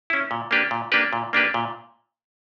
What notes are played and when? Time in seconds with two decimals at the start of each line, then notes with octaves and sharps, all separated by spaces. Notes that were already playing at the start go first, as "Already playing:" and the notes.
0.10 C#4 E4
0.31 A#2
0.51 A#3 D4 G4 B4
0.71 A#2
0.92 A#3 D4 G4 B4
1.13 A#2
1.33 A#3 D4 G4 B4
1.54 A#2